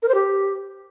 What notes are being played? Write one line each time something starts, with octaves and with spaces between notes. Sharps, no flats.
A#4
C5
G4